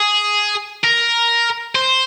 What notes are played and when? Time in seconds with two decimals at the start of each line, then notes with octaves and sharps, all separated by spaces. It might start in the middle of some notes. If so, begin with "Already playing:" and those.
Already playing: G#4
0.84 A#4
1.75 C5